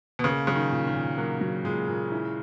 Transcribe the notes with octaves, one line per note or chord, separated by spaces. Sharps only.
B2
C#3 A#3
C#3 F#3
D#3
A#2
D#3
A#2
F#3 A#3
F#3
A#2 G#3
A#2
E4